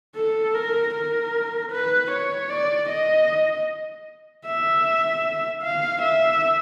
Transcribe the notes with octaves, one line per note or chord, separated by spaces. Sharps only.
A4
A#4
A#4
B4
C#5
D5
D#5
E5
F5
E5